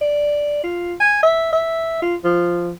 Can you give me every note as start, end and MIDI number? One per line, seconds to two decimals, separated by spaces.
0.01 0.60 74
0.63 0.94 65
1.00 1.19 80
1.23 1.49 76
1.53 2.00 76
2.02 2.15 65
2.24 2.71 53